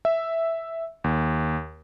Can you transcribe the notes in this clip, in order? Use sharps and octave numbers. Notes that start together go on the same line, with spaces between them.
E5
D#2